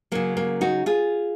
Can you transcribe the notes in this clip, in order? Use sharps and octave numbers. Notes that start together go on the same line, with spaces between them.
C#3 F#3 A#3
A#3
D#4 F#4
F4 G#4